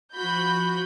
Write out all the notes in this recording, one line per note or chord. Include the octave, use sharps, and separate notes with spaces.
F3 F#4 B5 G6